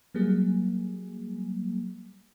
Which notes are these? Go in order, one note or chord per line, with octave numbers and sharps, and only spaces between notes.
F#3 G3 A#3 G#4